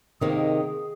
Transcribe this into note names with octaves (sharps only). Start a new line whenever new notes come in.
C3 D#3 A#3 D#4 G#4